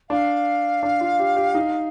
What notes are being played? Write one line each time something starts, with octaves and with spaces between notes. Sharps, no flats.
D4 F5
D4
F4
G4
G4
D#4